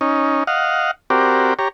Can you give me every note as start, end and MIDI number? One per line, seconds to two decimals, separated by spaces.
0.01 0.44 61
0.01 0.44 63
0.47 0.91 75
0.47 0.91 77
0.47 0.91 78
1.10 1.54 60
1.10 1.54 66
1.10 1.54 67
1.10 1.54 70
1.10 1.54 74
1.59 1.68 67
1.59 1.68 73
1.59 1.68 82